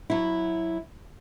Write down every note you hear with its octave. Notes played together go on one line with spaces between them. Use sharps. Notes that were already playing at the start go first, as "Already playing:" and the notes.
F#3 E4